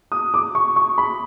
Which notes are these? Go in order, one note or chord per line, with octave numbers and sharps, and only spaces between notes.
D#6
D6
C#6
C#6
B5